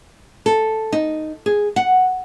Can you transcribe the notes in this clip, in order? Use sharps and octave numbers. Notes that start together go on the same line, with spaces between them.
A4
D#4
G#4
F#5